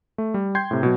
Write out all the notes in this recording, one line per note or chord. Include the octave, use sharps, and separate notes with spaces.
A3
G3
G5 C6 G6 G#6 C7
A2 C3
B2 F#3